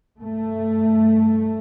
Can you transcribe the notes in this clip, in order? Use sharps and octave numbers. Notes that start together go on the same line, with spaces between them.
G2 A3